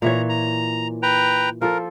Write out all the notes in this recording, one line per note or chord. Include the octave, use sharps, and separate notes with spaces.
A#2 E3 C#5 A#5
A#5
B4 G5 A#5
F3 A4 A#4